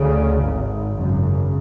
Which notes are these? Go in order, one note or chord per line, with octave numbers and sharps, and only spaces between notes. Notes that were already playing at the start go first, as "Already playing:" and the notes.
Already playing: D2 C#3
G#1 G#2
G#1 F#2 C#3